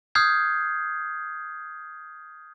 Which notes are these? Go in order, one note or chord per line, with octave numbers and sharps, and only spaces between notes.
D#6 F6 G6 G#6 C7